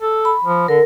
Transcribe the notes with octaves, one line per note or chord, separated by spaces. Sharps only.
A4
B5
F3
D3 A#4